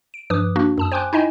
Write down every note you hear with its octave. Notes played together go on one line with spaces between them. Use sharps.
D7
G2 F3 B4 D6 D#6
A#3 D4 F#4
F#2 A5 D#6
C5 G5 G#5 C6 D6 F#6
D#4 E4 D#5 G5 G#5